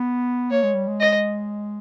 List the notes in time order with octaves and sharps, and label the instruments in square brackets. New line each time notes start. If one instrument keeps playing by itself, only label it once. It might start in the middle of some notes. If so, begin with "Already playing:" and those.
Already playing: [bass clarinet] B3
[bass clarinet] A#3 [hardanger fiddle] C#5
[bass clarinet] G#3
G3
G#3
[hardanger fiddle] D#5